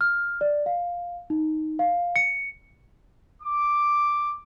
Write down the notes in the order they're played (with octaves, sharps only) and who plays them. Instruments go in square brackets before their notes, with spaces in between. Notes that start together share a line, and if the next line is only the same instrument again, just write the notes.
[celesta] F6
D5
F5
D#4
F5
C#7
[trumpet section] D6